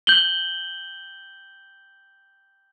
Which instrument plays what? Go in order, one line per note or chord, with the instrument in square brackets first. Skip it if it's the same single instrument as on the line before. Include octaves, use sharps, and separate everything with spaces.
[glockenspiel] G6 F#7 G7